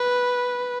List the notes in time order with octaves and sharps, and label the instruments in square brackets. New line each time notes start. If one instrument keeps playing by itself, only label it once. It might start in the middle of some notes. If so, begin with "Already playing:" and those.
Already playing: [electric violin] B4